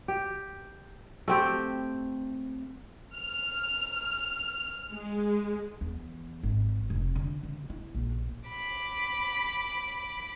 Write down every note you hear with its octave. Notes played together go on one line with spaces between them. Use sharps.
G4
A3 C4 G4
F6
G#3
E2
G#1
F1
D3
D3
E4
A#1
B5 D6